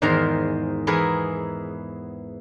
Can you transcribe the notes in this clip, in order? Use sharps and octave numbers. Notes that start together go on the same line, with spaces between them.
E2 G#2 D#3 A#4 C5 A#5
E3 B3 E4 G#4 A#4